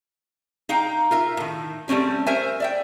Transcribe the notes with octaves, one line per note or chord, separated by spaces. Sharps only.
D#4 F5 G5 A#5
F4 A#4 E5
A2 D#3
G3 A3 C4 C#4 G4
A#4 C5 E5 G#5
D5 E5 G5